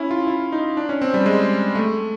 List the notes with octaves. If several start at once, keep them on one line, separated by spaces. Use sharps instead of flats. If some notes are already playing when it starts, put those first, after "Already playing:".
Already playing: C#4 E4
F4
E4
D#4
D4
C#4
C4
G3
G#3
A3